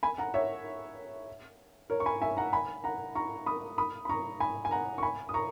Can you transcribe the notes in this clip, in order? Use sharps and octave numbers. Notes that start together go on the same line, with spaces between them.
G#5 B5
F#5 A#5
C#5 E5
A#4 C#5
C#6
G#5 B5
E5 G#5
F#5 A#5
G#5 B5
F#5 A#5
A#5 C#6
B5 D#6
B5 D#6
B5
A#5 C#6
G#5 B5
G#5
F#5 A#5
C#6
G#5 B5
D#6
A#5 C#6